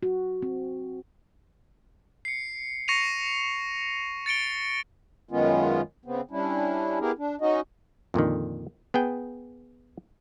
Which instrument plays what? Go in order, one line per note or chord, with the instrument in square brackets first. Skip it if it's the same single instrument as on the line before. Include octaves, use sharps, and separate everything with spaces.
[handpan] F#4
C4
[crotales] C7 C#7
C#6 A#6 C7 C#7 D#7 F7
A6 C#7 D7 G7
[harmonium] F#2 D#3 G#3 B3 C#4 F4
C#3 B3 C4
G3 C#4 D4 E4
B3 E4 G4 G#4 A#4
D4
C#4 D#4 F#4 D#5
[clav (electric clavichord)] F2 A#2 D3 D#3
B3 G#4 G5